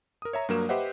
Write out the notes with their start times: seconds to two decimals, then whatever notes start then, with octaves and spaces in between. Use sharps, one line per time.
0.22 A#4 D#6
0.33 C#5 E5 A#5
0.49 G2 F#3 A#3 A#4 E7
0.69 G4 B4 C5 D#5 E5 F#5